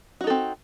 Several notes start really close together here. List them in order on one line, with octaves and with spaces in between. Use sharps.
F#4 D#4 A4 C4